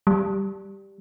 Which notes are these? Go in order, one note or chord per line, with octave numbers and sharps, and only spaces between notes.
G3